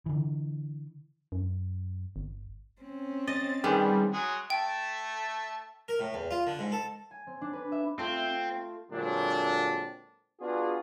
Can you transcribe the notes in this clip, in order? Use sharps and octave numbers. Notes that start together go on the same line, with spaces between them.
D3 E3
F#2
G1
C4 C#4
D#5 A6
D#3 G3 G#3 B3
F#3 G#3 G#4
A3 E5 G5 A5
A#4
A2
E2
F4
D3
G#2
A4
G#5
C4
D4
B4
E5
A3 C4 F4
A#2 D3 F#3 G#3 C4 D4
B3 D4 F4 F#4 G#4